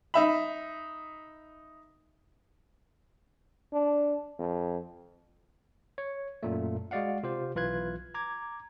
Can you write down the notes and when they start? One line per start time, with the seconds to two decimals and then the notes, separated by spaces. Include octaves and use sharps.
0.14 D#4 E5 B5
3.73 D4
4.39 F2
5.98 C#5
6.43 F#2 A#2 A3
6.91 G#3 F#4 D5 F5 F#5
7.23 C3 F4 G4 C5
7.55 B1 E3 F4 B4 F#6 G#6
8.14 A#5 D6 G#6